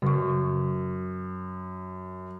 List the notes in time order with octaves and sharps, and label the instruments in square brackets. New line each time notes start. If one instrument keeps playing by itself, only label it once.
[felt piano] F#2 [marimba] C#3 C#6